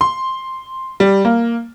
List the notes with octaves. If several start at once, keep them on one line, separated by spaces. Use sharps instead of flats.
C6
G3
A#3